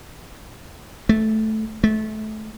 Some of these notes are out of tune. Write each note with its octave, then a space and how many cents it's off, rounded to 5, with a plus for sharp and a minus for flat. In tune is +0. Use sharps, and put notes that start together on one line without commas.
A3 -10
A3 -25